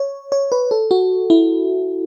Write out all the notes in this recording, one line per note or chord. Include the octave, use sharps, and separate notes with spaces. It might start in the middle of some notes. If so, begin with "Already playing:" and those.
Already playing: C#5
C#5
B4
A4
F#4
E4